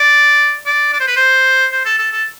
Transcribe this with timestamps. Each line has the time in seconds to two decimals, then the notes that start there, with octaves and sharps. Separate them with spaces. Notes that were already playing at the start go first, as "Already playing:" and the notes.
Already playing: D5
0.66 D5
0.93 D5
1.00 C5
1.07 B4
1.16 C5
1.72 C5
1.85 A4
1.98 A4
2.12 A4